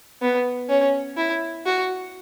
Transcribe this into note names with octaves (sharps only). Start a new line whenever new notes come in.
B3
C#4
E4
F#4